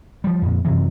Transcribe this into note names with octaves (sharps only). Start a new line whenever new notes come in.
F3 G3
F2 A#2
F#2 C3 E3